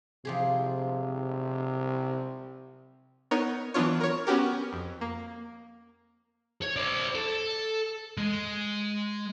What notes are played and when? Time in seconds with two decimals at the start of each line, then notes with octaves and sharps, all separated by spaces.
0.25 C3 F3 G4 G#4
3.31 B3 D#4 A#4 C#5
3.74 E3 F#3 B3 D4 F4 C#5
4.01 A#4 C#5
4.27 B3 C#4 F#4 G4 A#4
4.73 F2
5.01 A#3
6.62 C#5
6.76 C5 D5
7.15 A4
8.18 G#3